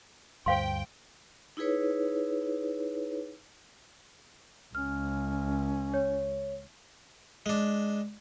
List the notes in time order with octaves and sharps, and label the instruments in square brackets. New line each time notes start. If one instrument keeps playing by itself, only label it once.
[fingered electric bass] D2 G2 [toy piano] C5 F5 C6 [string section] G5
[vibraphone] D#4 E4 G#4 B4 C#5
[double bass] C#2 [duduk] C#4 [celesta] F6
[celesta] C#5
[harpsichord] G#3 D4